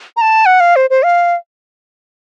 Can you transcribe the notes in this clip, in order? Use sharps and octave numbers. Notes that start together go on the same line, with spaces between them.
A#5
A5
F#5
F5
C5
C5
F5